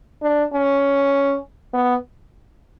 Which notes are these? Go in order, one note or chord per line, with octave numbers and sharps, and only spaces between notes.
D4
C#4
B3